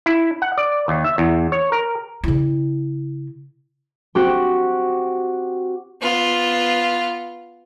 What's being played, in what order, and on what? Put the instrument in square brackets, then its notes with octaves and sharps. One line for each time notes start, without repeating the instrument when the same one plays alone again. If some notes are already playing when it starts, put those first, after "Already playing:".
[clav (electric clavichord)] E4
F#5
D5
D#2
E5
E2
C#5
A#4
[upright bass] C#3 E4
[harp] C4 F#4 G4
[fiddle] B3 F4